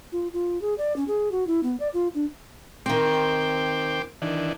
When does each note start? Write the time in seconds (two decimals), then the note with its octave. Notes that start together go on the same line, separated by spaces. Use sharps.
0.12 F4
0.33 F4
0.62 G#4
0.78 D5
0.96 C#4
1.08 G#4
1.32 F#4
1.47 E4
1.63 B3
1.80 D5
1.94 F4
2.15 D4
2.86 D#3 C4 G5 C6 D6
4.22 D#3 E3 D4